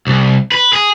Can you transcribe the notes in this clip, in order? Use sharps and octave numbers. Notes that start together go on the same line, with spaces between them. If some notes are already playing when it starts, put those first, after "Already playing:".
C2
B4
G#4